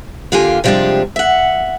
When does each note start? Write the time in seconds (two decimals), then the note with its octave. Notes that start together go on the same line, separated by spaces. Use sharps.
0.32 D3 A#3 F4 G4 G#5
0.64 C3 F3 G3 G#3 D4 G4
1.16 E5 F#5